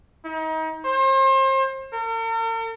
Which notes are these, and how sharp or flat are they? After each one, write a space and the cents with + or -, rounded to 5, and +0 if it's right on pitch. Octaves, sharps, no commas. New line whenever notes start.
D#4 +35
C5 +35
A#4 -45